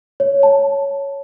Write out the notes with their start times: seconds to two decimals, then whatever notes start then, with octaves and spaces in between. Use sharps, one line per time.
0.20 C#5
0.43 A5